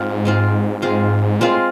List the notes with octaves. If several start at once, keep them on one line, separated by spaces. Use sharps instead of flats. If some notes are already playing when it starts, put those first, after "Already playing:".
Already playing: G#2 C4 F4
G#3 C4 F4
G#3 C4 F4
A#2 G#3 C4 F4
A2